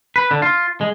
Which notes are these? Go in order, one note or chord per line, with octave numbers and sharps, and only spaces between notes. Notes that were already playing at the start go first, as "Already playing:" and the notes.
B4
D3
F4
G#3